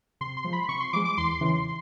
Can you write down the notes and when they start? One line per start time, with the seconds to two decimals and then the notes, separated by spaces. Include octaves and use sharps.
0.21 C3 C6
0.37 C6
0.44 F3 G#3
0.53 B5
0.68 C3 C#6
0.80 C6
0.93 F3 G#3 D6
1.05 D6
1.17 E2 C6
1.41 C#3 E3